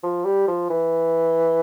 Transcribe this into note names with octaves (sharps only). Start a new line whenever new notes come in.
F3
G3
F3
E3